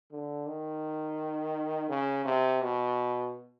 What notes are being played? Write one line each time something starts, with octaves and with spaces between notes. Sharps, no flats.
D3
D#3
C#3
C3
B2